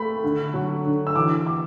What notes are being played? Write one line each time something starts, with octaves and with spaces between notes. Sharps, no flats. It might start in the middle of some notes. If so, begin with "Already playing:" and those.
Already playing: A3 B5
D3
F#3
D3
E6
E3 D6
D6